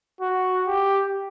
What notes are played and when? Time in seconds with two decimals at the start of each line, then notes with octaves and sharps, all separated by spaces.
0.21 F#4
0.68 G4